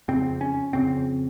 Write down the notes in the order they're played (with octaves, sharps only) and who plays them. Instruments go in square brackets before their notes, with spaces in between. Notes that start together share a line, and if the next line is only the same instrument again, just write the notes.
[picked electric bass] F2 C#3 C4
C#4
F2 C#3 C4